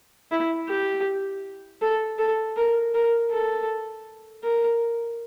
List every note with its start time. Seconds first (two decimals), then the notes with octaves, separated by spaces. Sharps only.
0.32 E4
0.69 G4
1.82 A4
2.19 A4
2.57 A#4
2.94 A#4
3.32 A4
4.44 A#4